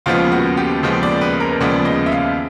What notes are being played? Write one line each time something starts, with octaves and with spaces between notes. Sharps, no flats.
D#2 C#3 F3 G#3 B3 F4
F#4
G4
D#2 C#3 F3 G#3 B3
D5
B4
A#4
D#2 C#3 F3 G#3 B3 D5
D#5
E5
F5